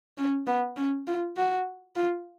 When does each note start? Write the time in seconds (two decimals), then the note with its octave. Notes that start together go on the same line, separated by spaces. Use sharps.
0.18 C#4
0.47 B3
0.77 C#4
1.07 F4
1.37 F#4
1.96 F4